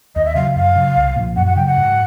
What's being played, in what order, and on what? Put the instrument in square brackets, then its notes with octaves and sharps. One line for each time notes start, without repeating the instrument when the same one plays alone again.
[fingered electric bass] D#2 [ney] D#5
[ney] E5
[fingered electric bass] C#3 F#3 [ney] F5
[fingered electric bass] F#2 [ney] F5
[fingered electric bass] C#3 F#3
C2
A#2 F3
[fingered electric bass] F#2 [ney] F#5
[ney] F#5
[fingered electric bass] C#3 F#3 [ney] G5
[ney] F#5
[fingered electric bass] G#2